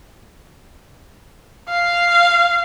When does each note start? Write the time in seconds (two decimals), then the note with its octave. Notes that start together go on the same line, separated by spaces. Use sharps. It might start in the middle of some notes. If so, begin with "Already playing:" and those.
1.69 F5